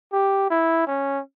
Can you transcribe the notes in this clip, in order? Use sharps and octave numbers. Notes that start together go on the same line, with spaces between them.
G4
E4
C#4